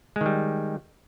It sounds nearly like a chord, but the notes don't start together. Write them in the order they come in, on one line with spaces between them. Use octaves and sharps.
G#3 D#3 G3